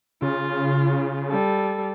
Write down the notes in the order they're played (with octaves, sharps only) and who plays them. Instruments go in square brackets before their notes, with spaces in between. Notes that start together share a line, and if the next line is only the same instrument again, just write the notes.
[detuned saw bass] C#3 [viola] F4
[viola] G3 A4